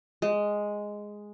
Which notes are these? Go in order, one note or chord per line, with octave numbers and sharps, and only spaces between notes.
G#3